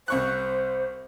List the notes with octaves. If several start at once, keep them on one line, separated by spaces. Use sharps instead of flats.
C2 C5 C#6 F#6